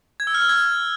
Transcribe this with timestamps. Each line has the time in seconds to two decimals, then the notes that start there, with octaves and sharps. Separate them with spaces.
0.20 G#6
0.27 E6
0.34 F6
0.42 E6
0.49 G#6